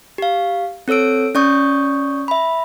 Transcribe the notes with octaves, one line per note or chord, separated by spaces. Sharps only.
G4 F5
C4 A4 C#5 E6 D7
C#4 D5 C#6 D#6 G6
E5 B5